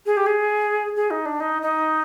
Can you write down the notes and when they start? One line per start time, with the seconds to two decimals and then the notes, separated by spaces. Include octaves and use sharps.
0.06 G#4
0.17 G4
0.26 G#4
0.96 G#4
1.11 D#4
1.26 D4
1.40 D#4
1.62 D#4